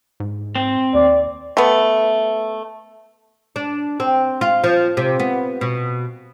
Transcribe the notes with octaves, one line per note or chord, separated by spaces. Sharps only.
G#2
C4
D#2 D5
A3 B3
D4
C4
F4
F3
C3
B3
B2